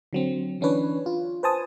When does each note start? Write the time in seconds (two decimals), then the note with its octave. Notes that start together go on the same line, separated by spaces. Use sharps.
0.13 D3 F#3 C4
0.61 E3 C#4 D4 B4 C#5
1.06 F4
1.43 B4 C5 G#5 A5 D#6